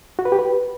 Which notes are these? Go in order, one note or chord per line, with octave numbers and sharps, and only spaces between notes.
F#4
B4
G4
B4